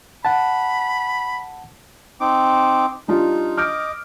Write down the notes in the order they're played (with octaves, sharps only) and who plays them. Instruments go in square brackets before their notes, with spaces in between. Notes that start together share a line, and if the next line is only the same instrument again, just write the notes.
[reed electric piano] F#5 A5 [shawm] B5
[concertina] C4 D#4 D6
[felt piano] G3 D4 F4 [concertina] D#4
[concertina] D#5 D6 [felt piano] F6 G6 D7